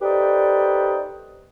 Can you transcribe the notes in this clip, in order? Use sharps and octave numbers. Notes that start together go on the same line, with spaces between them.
D#4 G4 A4 B4 C5 D5